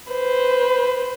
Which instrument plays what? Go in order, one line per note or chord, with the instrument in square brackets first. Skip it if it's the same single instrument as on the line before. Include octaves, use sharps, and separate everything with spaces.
[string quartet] B4 C5